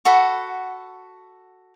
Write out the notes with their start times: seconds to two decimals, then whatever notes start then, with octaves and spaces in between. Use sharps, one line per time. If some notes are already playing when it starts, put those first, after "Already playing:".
0.05 F#4 A4 F#5 B5